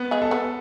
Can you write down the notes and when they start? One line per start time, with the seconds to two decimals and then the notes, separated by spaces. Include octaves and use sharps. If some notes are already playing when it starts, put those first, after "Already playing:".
Already playing: B3
0.11 G#3 G#4
0.22 A4
0.31 B3 B4